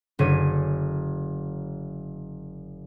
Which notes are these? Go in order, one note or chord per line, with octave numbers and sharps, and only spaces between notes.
F#1 D3 C#5 D6 D#7